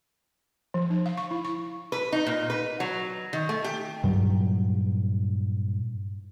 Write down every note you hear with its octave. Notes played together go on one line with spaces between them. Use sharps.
F3
D#4
F5
C#6
E4
C#6
B4
D#4
A#2
B4
F#3
D#3
A3
G4
G2 A#2 F#3